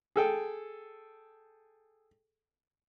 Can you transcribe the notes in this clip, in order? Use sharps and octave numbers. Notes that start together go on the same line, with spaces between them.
G#4 A4 G5